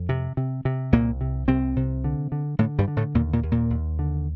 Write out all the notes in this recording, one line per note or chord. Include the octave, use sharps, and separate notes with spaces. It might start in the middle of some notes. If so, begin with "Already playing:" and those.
Already playing: F2
C3
C3
C3
C2 A#2 A#3
C3
C2 C3 C4
C3
D3
D3
A2 D3 A3
G2 G3
D3
A2 A3
D#2 A#2 A#3
A#2 A#3
D#2
A#2 A#3
D#2
D3